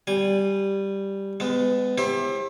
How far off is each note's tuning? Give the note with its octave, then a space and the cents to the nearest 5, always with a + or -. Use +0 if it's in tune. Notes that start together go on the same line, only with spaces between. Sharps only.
G3 +0 G#5 -20
G#3 -20 B3 +25
E4 +0 G4 +30 C5 +40